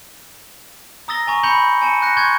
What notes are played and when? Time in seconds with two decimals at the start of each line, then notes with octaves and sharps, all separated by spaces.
1.08 A#5 D#6 E6 A6 A#6 G7
1.27 G#5 A#5 C#6
1.43 A#5 B5 G6 C#7 G7
1.82 G#5 A5 C#7 D#7
2.02 F#6 G6 A#6 C#7
2.17 C6 C#6 G6 G#6